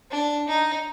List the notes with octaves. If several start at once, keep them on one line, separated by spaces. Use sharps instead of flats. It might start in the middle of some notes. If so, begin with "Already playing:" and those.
D4
D#4